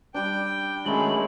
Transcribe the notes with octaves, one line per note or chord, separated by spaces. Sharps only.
G3 D4 G5
D#3 F#3 G#3 A3 C#4 G#4 B5